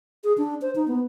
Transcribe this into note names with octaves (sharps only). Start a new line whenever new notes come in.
G#4
D4
C5
D#4
B3